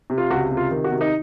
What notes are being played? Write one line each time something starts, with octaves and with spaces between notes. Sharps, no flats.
C3
F4
C#2 F#4
C3
F4
D#3
F#4
C3
D#4